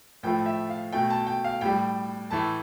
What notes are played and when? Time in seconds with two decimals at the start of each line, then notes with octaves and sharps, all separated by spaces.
0.23 A2 F3 A3 G5
0.46 E5
0.70 F5
0.93 B2 A3 G5
1.10 A5
1.27 G5
1.44 F5
1.61 A2 G3 G5
2.31 A2 E3 A3 A5